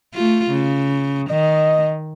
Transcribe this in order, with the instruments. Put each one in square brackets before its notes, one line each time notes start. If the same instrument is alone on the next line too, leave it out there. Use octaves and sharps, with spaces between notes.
[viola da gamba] A3 F4
C#3
[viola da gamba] D#3 [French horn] D#5